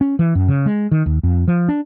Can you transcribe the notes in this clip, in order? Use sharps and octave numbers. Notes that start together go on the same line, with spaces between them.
C#4
E3
F#2
C#3
G#3
D#3
D#2
F2
F3
D4